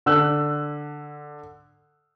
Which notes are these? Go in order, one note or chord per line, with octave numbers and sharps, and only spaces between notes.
D3 E6 F#6